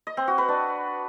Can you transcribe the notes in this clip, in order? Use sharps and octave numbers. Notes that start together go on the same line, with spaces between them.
D#5
C4
F#4
B4
D4